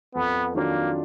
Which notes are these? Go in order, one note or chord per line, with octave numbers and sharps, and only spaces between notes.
F2 B3
D#3 F#3 A#3 D4 F4